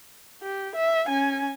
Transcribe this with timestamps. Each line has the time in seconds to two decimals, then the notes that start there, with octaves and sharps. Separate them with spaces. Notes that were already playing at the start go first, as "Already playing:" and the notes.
0.42 G4
0.75 E5
1.08 C#4 G#5